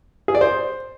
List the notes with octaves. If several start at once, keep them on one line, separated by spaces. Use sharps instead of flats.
G#4
D5
C5